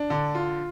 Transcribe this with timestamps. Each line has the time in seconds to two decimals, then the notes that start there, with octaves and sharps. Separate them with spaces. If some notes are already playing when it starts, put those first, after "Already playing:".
Already playing: D4
0.10 D3
0.35 F4